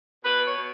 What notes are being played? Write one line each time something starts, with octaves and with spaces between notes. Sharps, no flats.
B2 B4
C#5
B2